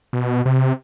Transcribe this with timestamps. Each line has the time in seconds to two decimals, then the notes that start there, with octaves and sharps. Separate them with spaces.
0.13 B2
0.45 C3